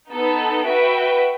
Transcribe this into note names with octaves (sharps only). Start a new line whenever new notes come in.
B3 D#4 A4
F#4 B4 E5 G5